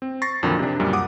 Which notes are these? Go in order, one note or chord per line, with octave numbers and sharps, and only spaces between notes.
C4
C#6 A6 A#6 C7
F2 A#2 D3 D#3 F#3
C3 D4
C#2 F#2 A#2 G3
F#5 D6 D#6